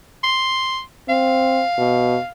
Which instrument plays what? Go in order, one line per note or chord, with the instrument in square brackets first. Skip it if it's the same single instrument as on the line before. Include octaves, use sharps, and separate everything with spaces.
[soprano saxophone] C6
[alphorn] C4 [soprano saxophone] F5
[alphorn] B2